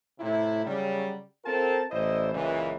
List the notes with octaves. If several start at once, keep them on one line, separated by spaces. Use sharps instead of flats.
A2 C3 E4
C#3 F#3 G3
C4 F4 A4 A#4 A5
A1 E4 C5 D5 D#5
C#2 F#2 A#2 E3